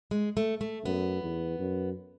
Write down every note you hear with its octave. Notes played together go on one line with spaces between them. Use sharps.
G#3
A3
A3
F#2 B3
E2
F#2